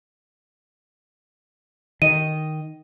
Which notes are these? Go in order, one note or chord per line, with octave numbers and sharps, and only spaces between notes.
D#3 D#5 D#7